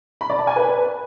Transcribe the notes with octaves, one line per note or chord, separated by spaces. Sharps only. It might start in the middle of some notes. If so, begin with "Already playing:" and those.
B5
D5
A5
G#5
B4